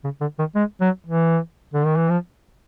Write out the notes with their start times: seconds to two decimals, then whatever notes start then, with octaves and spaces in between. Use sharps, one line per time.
0.04 C#3
0.21 D3
0.38 D#3
0.55 G#3
0.81 F#3
1.06 E3
1.73 D3
1.85 D#3
1.96 E3
2.09 F3